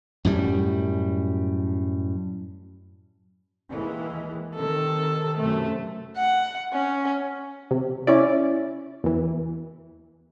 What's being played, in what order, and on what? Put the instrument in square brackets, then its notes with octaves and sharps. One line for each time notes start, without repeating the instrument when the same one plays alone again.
[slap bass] F#2 A2 G3
[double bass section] D#2 E3 G#3
[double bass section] C3 D#3 [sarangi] A4
[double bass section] F#2 C3 [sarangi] A3
[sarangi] F#5
C#4
[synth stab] C3
C#4 E4 D5
E2 E3